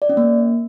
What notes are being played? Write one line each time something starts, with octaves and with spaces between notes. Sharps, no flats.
D5
C#4
A#3